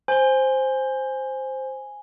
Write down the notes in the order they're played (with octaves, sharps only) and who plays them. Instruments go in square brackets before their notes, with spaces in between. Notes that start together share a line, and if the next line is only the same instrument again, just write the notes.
[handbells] C5 [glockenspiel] G#5 G7